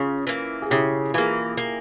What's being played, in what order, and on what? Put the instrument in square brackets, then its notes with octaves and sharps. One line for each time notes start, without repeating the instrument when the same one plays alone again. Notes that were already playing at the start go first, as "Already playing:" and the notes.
Already playing: [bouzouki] C#3 [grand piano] C#4 F4
[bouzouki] E3 A#3
[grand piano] G#4
[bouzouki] C#3 [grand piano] E4 G4
[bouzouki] E3 A#3 [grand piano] F4 G#4
[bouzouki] A#3